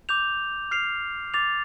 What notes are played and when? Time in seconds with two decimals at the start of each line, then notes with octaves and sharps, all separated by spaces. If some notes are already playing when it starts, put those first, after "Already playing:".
0.09 D6 G6 F7
0.71 F6 C7 F7
1.34 D6 A6 F7